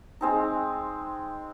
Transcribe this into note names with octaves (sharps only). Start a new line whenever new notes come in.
G#3 C4 D#4